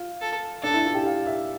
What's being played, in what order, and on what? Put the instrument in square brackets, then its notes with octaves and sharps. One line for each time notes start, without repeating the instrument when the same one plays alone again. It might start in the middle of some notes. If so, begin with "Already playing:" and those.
Already playing: [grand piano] F4
[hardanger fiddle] A4
[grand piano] D4 [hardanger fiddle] A4
[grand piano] E4
F4
G4
F5
E5